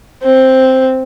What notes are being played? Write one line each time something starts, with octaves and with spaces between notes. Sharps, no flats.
C4